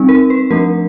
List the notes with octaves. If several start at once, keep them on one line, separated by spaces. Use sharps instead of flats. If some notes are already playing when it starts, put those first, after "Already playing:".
Already playing: G3 C4 D#4
A#4
B4
F3 A3 D4 A#4